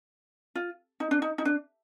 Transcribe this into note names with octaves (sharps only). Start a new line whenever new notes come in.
F4
D#4
D4
D#4
D#4
D4